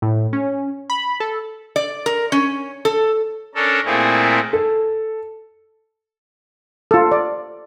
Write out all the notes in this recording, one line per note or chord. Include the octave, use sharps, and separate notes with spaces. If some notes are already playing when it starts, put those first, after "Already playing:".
A2
C#4
B5
A4
D5
A#4
C#4
A4
C#4 D4 A4 A#4
A#2 A3 A#3 C4 E4 G#4
A4
F4 A4
D5